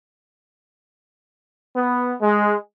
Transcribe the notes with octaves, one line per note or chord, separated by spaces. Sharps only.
B3
G#3